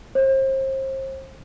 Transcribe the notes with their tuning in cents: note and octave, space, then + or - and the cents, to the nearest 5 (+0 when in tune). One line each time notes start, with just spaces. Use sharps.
C5 +35